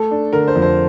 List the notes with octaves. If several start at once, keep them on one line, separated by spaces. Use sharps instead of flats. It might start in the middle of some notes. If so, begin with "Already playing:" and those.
Already playing: A3 A4
D4
D3 A#4
C5
F2
C5